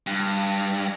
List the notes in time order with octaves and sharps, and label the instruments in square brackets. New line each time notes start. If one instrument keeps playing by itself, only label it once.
[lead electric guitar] G2